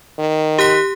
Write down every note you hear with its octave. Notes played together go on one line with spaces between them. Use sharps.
D#3
G4 F#6 B6